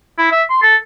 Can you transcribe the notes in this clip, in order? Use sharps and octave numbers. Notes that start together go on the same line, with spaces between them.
E4
E5
C6
A4